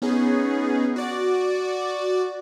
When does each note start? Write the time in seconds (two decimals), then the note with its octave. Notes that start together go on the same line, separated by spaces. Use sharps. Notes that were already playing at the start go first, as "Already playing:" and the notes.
0.02 B3 C#4 D#4 G#4
0.96 F#4 D5